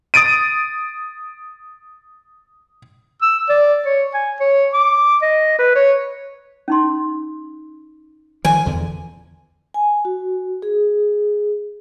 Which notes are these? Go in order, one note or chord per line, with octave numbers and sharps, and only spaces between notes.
D#6 A6 D7 D#7
E6
D5
C#5
G#5
C#5
D6
D#5
B4
C#5
C#4 D#4 C6
D#3 F3 G#5
E2 D3
G#5
F#4
G#4